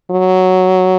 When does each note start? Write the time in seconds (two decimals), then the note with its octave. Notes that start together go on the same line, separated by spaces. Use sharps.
0.11 F#3